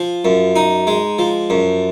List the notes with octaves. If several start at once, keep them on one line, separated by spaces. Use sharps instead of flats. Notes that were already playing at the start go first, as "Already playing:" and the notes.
Already playing: F3
F#2
D#4
G#3
F3
F#2